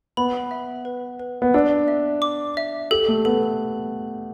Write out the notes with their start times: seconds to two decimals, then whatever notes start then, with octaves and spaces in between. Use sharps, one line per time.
0.17 B3 B5
0.51 E5
0.85 B4
1.19 B4
1.42 B3
1.54 D4 E6
1.88 E5
2.22 D6
2.57 E5
2.91 G4 A4
3.08 A3
3.25 B3 A4